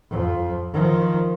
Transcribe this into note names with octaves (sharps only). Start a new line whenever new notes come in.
F2 F3
D#3 F3